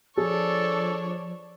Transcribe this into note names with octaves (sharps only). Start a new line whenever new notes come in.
F3 D4 G#4 A4 C#5